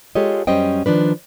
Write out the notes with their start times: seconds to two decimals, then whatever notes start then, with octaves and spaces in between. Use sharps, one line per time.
0.15 G#3 F4 G4 A4 C#5 D#5
0.47 F#2 G3 C#4 C5 D#5 G5
0.86 D#3 F3 D4 B4